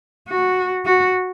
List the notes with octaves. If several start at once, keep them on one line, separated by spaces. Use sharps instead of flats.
F#4
F#4